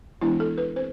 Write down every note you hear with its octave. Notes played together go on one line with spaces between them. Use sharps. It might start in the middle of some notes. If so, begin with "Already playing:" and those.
E3 G#3 B3 D4 E4
A4
B4
C4 C5